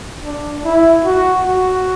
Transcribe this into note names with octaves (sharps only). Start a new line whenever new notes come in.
D4
E4
F#4
F#4